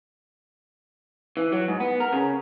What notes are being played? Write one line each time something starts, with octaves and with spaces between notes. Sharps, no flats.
E3
F#3
G#2
B3
A#4
C#3